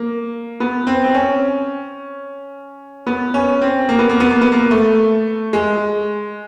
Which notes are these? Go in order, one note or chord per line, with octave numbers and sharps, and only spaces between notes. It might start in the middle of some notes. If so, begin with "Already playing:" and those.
Already playing: A#3
B3
C4
C4
C#4
B3
C#4
C4
A#3
B3
A#3
B3
A#3
B3
A#3
A3
G#3